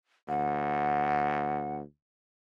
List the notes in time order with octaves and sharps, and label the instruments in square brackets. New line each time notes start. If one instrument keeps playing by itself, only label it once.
[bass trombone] D2 [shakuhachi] F#5